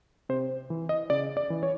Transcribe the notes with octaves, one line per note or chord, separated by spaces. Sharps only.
C3 C5
E3
D#5
C#3 D5
D5
E3
C#5